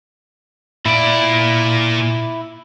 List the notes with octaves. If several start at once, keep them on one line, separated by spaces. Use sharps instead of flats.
A#2 E4 D5